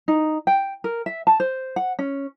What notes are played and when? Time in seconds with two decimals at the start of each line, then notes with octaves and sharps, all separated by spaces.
0.08 D#4
0.47 G5
0.84 A#4
1.06 E5
1.27 A5
1.40 C5
1.76 F#5
1.99 C#4